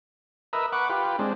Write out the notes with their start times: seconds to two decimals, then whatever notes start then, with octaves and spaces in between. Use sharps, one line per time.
0.53 A#4 B4 D#5 E5
0.73 B4 F#5 C#6 D6
0.89 F4 G4 B4
1.19 G#3 C4 D4